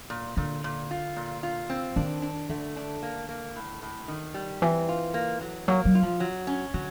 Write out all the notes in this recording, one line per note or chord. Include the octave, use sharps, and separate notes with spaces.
A#2
A#2 D3
A#2
F4
A#2
F4
C4
D#3 D4
D4
D3 A3
D4
A#3
A#3
A2
A2
D#3
G3
E3 C4
F4
A#3
F#3
F#3 A#3
F#3
F4
F3
F#3
C#4
D3 F#3